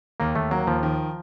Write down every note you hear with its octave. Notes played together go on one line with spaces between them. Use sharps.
D#2 A#3
D#2 A3
F#3 A#3
D#2 F3
D#3